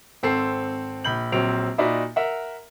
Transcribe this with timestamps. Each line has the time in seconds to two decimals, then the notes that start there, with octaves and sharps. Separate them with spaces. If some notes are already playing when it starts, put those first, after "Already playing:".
0.23 G#1 C4 A4 C7
1.04 A#1 B5 G6 F#7
1.32 A#1 F#3 C4 C#5 D7 F7
1.78 A#2 D#4 F#4 D5 E5 B5
2.16 A#4 E5 F#5